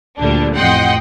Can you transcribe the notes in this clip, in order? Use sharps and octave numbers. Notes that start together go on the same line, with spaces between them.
D2 A#2 D3 G3 D4
A1 F2 D#5 F#5 G5 C6